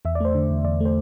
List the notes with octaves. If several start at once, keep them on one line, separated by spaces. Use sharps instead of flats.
E2 E5
D5
A3 C5
D3
E2
E2 D5
A3 C5